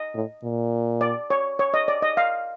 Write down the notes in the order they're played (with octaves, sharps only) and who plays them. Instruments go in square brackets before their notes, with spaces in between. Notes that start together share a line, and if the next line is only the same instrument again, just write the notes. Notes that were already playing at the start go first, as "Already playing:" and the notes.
Already playing: [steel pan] D#5
[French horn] A2
A#2
[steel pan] D5
C#5
C#5
D#5
D5
D#5
F5